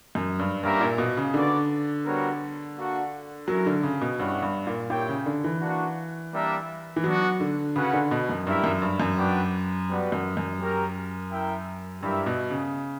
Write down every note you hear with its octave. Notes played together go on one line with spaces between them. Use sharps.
F#2
G2
G2 A#3 C#4 G4 A#4 E5
A#2
B2
C#3
D3 F#4 B4 D5
G3 B3 F#4 A#4 C#5
A#3 D4 F#4
F#3 C#4 E4 A#4
D3
C#3
B2
G2 C#4 E4 G4 C#5 F#5
G2
A#2
A#2 E4 G4 C#5 G5
C#3
D3
E3
A#3 D4 F#4
G3 A#3 D4 A#4 E5
E3
F#3 B3 D4 F#4
D3
C#3 C#4 F#4 B4 F#5
D3
B2
F#2
G2 E4 G4 A#4 E5
F#2
G2
F#2
D4 F#4 B4 D5 G5
G3 B3 F#4 B4 D5
F#2
F#2
C#4 G4 A#4
E4 A#4 E5 G5
G2 E4 G4 A#4 E5
B2
C#3